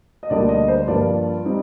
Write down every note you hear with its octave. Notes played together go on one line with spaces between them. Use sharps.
D#5
D2 D3 G3 A#3 D5
D#5
C5
G2 F3 A#3 F4 D5
G3 C4 D#4